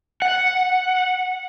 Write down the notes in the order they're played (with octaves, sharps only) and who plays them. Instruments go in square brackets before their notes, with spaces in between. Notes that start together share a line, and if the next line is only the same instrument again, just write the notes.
[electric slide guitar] F#5